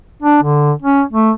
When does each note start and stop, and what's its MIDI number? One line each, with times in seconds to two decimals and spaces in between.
0.23 0.41 62
0.43 0.72 50
0.83 1.03 61
1.13 1.31 57